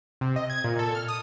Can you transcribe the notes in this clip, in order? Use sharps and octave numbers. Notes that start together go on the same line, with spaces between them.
C3
D#5
G#6
A#2
A4
F6
D#6